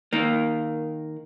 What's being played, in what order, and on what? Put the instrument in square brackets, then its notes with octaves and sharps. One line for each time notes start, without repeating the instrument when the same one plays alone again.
[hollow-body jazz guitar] D#3 A#3